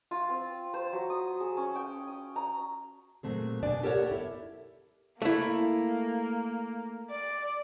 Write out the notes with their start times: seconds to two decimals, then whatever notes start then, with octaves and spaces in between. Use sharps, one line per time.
0.11 F4
0.29 C4
0.74 C5
0.93 F#3
1.10 D#6
1.41 G#4
1.57 C#4
1.75 G5
2.07 D#6
2.36 A#5
3.23 A#2 F#3 A3 C4 G#4
3.62 B2 D4 D5 G#5
3.82 B3 G4 A4 A#4 C#5 F#5
4.07 E4 A4
5.22 A3 A#3 E4
7.10 D5